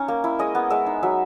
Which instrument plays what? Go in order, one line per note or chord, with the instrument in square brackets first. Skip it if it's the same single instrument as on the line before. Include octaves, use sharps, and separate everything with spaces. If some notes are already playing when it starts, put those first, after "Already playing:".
Already playing: [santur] C#4 D#4
A#3
E4
G#3 D#5
B3
G#3 E5
D#4
F#3 E5